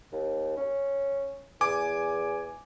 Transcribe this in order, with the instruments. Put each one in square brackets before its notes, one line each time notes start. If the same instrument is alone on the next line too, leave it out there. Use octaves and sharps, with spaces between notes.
[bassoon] D#2
C#4
[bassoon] E2 [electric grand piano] G#5 D6